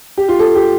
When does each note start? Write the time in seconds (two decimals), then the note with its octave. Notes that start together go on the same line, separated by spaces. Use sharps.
0.18 G4
0.29 F4
0.39 A4
0.55 G4